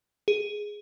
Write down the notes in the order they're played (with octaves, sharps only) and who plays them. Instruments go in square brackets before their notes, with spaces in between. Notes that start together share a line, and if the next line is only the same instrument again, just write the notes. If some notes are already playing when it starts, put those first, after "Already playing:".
[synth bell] G#4